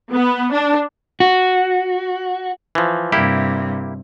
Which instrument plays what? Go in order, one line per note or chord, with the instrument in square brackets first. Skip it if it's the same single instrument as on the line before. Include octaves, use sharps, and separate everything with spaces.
[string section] B3
D4
[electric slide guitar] F#4
[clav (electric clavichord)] E3 F3
[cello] G2 C3 [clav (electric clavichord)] A#3 E4 G4